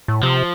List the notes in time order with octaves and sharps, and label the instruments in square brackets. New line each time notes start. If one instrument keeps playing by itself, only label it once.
[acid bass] A2
[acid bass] C3 [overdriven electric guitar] F3